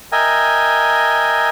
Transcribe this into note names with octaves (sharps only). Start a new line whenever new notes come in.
A#4 D#5 E5 G5 G#5